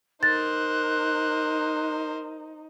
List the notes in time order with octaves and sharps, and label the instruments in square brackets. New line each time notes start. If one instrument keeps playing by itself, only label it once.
[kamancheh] D#4 [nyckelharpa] A#4 C5 [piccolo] F#6 [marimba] A6